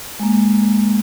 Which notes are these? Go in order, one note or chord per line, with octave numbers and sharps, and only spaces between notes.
G#3 A#3